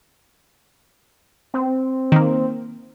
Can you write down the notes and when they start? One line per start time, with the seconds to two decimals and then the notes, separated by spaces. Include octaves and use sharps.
1.54 C4
2.12 D#3 A#3